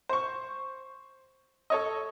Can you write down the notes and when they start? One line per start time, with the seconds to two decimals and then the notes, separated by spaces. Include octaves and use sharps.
0.09 C5 C#6
1.70 A4 C#5 D#5